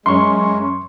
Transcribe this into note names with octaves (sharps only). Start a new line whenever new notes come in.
F#2 G#3 C#4 C6 C#6